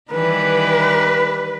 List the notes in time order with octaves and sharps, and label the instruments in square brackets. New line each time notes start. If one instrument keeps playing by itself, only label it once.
[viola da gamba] D#3 E3 G3 [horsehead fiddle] B4